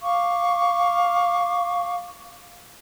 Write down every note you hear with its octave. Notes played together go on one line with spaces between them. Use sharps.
F5 C#6 D6